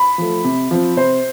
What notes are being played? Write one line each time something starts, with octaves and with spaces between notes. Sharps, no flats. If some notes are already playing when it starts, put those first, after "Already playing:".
Already playing: B5
F3 A3
C3
F3 C4
C3 C5